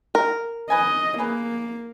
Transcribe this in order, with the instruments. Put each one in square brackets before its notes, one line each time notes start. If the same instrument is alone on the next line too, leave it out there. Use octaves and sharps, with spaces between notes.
[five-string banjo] A#4
[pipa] B4 G#5 [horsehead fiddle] D#5
[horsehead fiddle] A#3 [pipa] G#4 B4